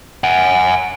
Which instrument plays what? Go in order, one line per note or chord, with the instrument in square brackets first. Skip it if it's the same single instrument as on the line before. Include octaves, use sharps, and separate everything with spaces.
[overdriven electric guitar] F#5 G#5